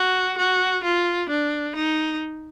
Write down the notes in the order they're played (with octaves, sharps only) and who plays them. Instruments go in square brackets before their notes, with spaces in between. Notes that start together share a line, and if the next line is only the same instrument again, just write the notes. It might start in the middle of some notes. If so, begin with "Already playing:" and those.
Already playing: [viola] F#4
F#4
F4
D4
D#4